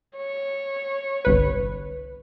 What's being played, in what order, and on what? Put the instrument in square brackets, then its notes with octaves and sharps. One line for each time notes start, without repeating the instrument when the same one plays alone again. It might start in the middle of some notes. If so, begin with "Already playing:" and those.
[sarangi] C#5
[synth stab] G1 C2 B4